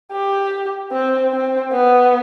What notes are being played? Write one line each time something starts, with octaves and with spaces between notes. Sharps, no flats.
G4
C4
C4
B3